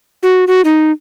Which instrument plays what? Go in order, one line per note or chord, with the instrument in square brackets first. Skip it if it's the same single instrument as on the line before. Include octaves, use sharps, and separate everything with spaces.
[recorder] F#4
F#4
D#4